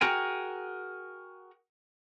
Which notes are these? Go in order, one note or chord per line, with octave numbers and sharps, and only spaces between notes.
F#4 G#4 A#4 G5 G#5